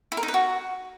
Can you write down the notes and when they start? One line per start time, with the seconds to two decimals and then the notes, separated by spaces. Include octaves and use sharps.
0.12 E4
0.17 A#4
0.23 D#4
0.28 B4
0.34 F#4